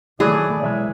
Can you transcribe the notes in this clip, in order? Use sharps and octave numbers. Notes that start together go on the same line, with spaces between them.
D#3 E3 F#3 A3 G#4 D5
B1 E3 G#3 E5